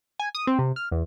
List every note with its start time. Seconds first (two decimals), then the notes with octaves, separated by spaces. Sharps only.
0.19 G#5
0.35 D#6
0.47 C4
0.59 C3
0.76 F6
0.92 E2